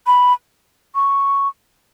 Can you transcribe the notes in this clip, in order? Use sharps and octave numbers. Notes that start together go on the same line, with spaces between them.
B5
C#6